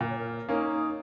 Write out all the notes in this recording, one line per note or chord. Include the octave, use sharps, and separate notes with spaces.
A#2 A#4
C#5
A#4
A#3 C#4 D#4